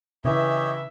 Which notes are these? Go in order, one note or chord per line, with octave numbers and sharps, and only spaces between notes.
C#3 E3 G4 C#5 D#5 E5